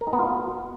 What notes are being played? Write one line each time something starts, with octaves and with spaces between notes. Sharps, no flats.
A#4
D#4
B3
F4
F#4